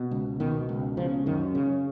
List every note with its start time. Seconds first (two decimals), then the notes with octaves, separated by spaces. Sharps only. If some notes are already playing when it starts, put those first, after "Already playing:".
Already playing: B2
0.11 C#2
0.40 B2 D#3
0.69 C#2
0.97 C#3 F3
1.26 F#2 D#3
1.55 C#3